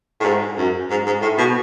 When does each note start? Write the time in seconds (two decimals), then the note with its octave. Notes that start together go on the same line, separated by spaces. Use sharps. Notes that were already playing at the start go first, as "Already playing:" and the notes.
0.20 A2
0.25 G#2
0.57 F#2
0.90 G#2
1.06 G#2
1.22 A2
1.38 B2